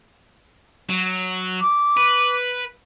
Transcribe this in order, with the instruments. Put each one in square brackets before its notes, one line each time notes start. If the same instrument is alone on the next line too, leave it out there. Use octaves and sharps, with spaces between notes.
[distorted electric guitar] F#3
[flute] D6
[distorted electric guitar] B4